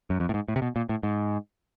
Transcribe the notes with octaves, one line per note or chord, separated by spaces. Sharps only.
F#2
F2
A2
G#2
A2
C3
B2
A#2
A2
G#2